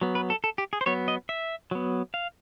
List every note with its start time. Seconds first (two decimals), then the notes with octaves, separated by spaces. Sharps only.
0.01 F#3 B3
0.15 B4
0.30 A4
0.44 A4
0.58 G4
0.73 G#4
0.81 C5
0.86 F#3 B3 C#5
1.08 D#5
1.29 E5
1.71 F#3 B3
2.14 F5